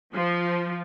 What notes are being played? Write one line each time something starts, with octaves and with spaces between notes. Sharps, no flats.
F3